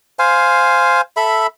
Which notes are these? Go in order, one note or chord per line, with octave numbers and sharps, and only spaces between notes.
C5 F5 G#5
A4 E5 B5